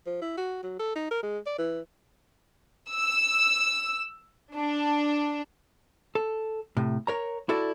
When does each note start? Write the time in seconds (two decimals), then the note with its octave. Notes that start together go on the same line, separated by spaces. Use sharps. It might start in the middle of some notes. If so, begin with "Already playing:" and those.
0.07 F3
0.22 E4
0.37 F#4
0.63 F#3
0.79 A4
0.96 D#4
1.11 A#4
1.23 G#3
1.46 D5
1.58 E3
2.93 E6
4.54 D4
6.15 A4
6.77 A2 C3
7.07 A#4 C#5 A#5
7.49 E4 F#4 A4 D5